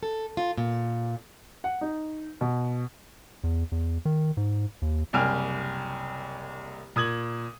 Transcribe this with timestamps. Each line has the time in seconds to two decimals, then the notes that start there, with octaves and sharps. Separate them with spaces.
0.03 A4
0.37 F4
0.57 A#2
1.64 F#5
1.81 D#4
2.41 B2
3.44 E2
3.72 E2
4.05 D#3
4.37 G#2
4.82 D#2
5.13 F#1 C2 G5 G#5 F6
6.96 A#2 D#6 G#6 F#7